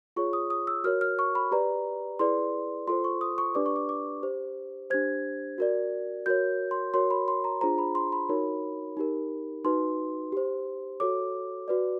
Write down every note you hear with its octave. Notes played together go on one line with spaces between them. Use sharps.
F4 G#4 C#5 C#6
D#6
D#6
E6
F#4 A#4 C#5 F6
F6
C#6
B5
G4 B4 D5 A#5
E4 G#4 B4 D5 C6
F4 A4 C5 C6
C#6
D#6
C#6
D4 G4 B4 D5 D6
C#6
D6
D6
G4 C5
D4 G4 C5 G#6
F#4 A#4 D5
F#4 A#4 C#5 G6
C6
F#4 A#4 C#5 C6
B5
C6
A#5
D4 F4 G#4 C5 A#5
B5
C6
B5
D#4 F#4 A#4 C#5
D#4 G4 A#4
D#4 F#4 B4 C6
G4 C5
F#4 A4 C#5 D6
F#4 B4 D5